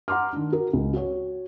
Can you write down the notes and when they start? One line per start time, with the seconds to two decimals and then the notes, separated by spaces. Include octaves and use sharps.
0.08 F#5 A#5 C6 D6 F6
0.33 D#3 D4
0.52 F#4 A#4
0.73 C#2
0.93 F#4 C#5